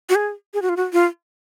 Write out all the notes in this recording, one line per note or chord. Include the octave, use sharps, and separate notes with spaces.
F#4
G#4
G#4
F#4
F4
F#4
F4